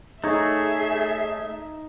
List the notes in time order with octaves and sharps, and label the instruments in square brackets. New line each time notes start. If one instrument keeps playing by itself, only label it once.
[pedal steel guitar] A3 C#5 [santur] D#4 [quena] G#4 [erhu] E5